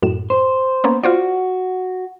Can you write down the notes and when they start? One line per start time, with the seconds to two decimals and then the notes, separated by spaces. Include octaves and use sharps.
0.02 F#2 A2 E7
0.30 C5
0.84 A#3 B3 C#4
1.03 F4 F#4 C5 D5